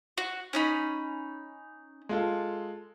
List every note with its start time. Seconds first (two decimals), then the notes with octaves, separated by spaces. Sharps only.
0.18 F#4
0.53 C#4 D#4 B5
2.09 G#3 F4 A4